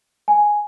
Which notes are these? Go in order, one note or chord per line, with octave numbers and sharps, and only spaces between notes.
G#5